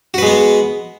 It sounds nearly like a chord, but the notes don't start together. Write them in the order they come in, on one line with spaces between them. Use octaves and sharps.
F#4 B4 G#3 B3